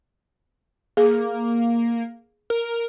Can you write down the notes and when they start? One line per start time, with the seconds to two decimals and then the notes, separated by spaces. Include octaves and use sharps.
0.97 A#3 G#4
2.50 A#4